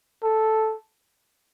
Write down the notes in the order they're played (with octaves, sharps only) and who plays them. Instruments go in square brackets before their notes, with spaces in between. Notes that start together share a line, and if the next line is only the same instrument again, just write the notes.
[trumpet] A4